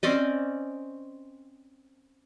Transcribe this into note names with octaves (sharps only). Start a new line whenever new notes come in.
C4 C#4 D5 D#5